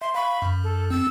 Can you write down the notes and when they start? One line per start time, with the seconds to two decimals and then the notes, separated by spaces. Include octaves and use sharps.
0.02 E5 C6
0.15 F5 B5 C#6
0.42 F#2
0.63 A4
0.90 C4 E6